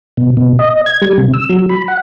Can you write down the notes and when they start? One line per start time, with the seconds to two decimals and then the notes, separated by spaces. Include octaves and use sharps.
0.17 B2
0.37 B2
0.59 D#5
0.86 G#6
1.02 G3
1.18 C3
1.34 E6
1.49 F#3
1.69 B5
1.88 F#5